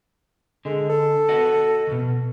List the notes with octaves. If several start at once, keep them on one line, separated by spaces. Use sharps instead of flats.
D3 G#3
A4
F#4 D#5 F#5
D2 B2